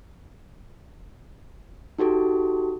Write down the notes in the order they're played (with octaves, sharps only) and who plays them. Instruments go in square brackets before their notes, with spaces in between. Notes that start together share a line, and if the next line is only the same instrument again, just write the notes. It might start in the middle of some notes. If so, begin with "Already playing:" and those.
[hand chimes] D#4 F#4 G4 A4